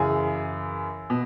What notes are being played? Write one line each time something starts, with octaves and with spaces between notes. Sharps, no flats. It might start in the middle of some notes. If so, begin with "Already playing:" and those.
Already playing: F#2 C#3 E3 G#4
B2